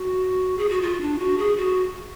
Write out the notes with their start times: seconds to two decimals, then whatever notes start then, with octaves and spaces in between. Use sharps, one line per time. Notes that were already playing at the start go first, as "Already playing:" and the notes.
Already playing: F#4
0.58 G#4
0.69 F#4
0.82 F4
1.01 D4
1.19 F#4
1.38 G#4
1.57 F#4